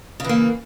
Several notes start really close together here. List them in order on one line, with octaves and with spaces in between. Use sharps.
C#3 E3 A#3